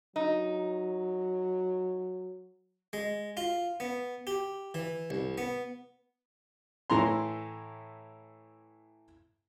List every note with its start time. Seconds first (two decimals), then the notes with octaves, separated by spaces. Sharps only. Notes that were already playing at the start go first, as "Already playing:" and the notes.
0.16 F#3 D#4
2.93 G#3
3.37 F4
3.80 B3
4.27 G4
4.74 E3
5.10 C2
5.38 B3
6.90 A2 E3 A#5 C6